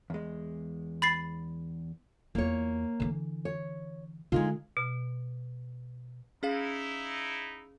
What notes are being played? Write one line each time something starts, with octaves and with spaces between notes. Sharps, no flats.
E2 G#3
B5 A6 C7
E2 A#3 F4 C#5
D3 E3
C#5
D3 G#3 D#4 F4
B2
C#4 D#4 E4 G#4 F5